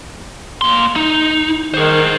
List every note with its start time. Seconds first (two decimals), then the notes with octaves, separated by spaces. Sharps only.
0.61 A#3 C6
0.96 D#4
1.74 D#3 G#4 C5